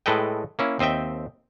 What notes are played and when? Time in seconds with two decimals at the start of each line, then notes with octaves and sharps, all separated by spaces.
0.06 A2 G#3 A4 B4 D#5 G5
0.59 A#3 C#4 E4
0.79 D#2 C4 D#5 E5 G5